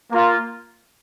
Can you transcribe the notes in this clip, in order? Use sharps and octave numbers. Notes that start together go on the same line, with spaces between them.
A#3 F4